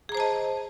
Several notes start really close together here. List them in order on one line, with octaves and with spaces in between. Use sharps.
G#4 A#5 C5 A5 D#5